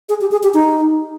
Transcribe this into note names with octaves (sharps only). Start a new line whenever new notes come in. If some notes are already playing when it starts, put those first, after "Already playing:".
G#4
G4
G#4
G4
D#4